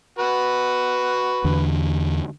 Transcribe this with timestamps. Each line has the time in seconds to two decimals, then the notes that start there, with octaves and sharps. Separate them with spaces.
0.19 F#4 B4 F#5
1.44 E2 D3